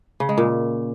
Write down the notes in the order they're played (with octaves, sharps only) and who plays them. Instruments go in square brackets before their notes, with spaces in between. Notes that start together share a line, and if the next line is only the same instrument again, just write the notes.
[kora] C#3
G#3
A#2